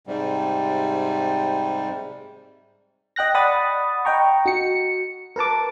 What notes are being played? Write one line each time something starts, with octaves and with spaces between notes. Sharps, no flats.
G#2 C3 G3
D#5 G5 F#6 A#6
D5 F#5 B5 D#6 A6
D#5 F#5 G5 A#5 C#6
F#4 C#7
A#4 B4 A5 D6